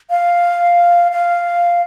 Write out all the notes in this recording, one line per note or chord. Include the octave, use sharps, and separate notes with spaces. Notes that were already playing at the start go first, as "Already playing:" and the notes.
F5
F5